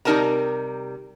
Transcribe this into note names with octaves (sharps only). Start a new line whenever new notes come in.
C3 G3 D#4 A#4 A5 A#5